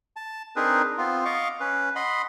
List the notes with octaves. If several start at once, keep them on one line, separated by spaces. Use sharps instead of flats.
A5
C4 D4 D#4 G#4 A#4 B4
B3 C4 F4
D#5 F5 C#6 D6
C#4 B4
D#5 F#5 B5 C6